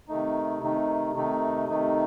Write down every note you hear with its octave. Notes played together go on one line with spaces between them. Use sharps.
C3 D#3 A3 D#4
C3 D#3 A3 D#4
C3 D#3 A3 D#4
C3 D#3 A3 D#4